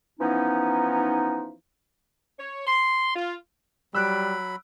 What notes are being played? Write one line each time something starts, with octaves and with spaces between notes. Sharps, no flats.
E3 F3 B3 C#4 D#4
C#5
C6
F4
F#3 G3 B5 E6 F#6 D7